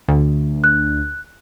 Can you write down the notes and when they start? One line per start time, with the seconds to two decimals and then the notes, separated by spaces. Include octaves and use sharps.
0.08 D2
0.64 F#6